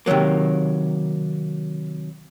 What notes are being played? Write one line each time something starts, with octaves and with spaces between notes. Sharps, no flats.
C3 D#3 E3 F#3 A#3